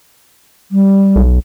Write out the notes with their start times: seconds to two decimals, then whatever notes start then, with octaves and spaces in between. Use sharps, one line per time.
0.72 G3
1.16 B1